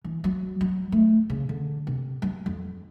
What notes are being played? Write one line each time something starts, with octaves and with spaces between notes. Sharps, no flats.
E3
F#3
F#3
A3
C#3
D3
C3
F#3
F2